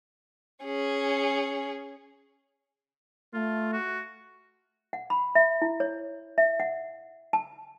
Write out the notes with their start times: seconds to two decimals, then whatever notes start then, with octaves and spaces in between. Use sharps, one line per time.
0.64 C#4 G#4
3.34 A3 F4
3.73 F#4
4.93 F#5
5.10 B5
5.35 E5
5.62 E4
5.80 C#5
6.38 E5
6.60 F#5
7.33 A5